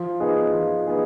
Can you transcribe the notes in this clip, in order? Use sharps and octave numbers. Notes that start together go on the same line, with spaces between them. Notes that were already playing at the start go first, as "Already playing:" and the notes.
Already playing: F3
B3 D#4 G#4
F3
B3 D#4 G#4